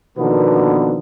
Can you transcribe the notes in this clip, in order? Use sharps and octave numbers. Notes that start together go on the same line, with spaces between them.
B2 D3 D#3 F3 A#3 B3